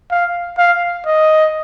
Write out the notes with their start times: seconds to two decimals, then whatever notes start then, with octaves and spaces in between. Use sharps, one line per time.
0.11 F5
0.58 F5
1.06 D#5